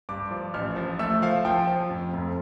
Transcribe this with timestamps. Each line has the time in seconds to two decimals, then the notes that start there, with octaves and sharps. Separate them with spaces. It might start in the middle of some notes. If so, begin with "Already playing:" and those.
0.09 G2 D6
0.31 F3
0.54 A1 F6
0.76 F3
0.99 A3 E6
1.22 F3 F5
1.45 F3 G5
1.67 F3
1.90 F2
2.13 F1